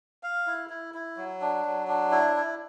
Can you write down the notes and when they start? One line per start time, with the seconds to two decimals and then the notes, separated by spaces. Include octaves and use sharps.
0.23 F5
0.47 E4
0.70 E4
0.94 E4
1.17 F#3
1.41 D4
1.65 F#3
1.88 D4
2.11 E4
2.36 E4